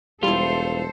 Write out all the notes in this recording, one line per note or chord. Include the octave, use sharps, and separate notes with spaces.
E1 G3 E4 F4 A4 C5